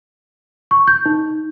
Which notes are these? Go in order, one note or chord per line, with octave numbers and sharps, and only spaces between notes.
C#6
G6
D#4